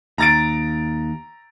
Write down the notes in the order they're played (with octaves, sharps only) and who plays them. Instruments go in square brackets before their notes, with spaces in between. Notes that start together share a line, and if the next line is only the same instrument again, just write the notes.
[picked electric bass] D#2 [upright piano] A#5 A6 D7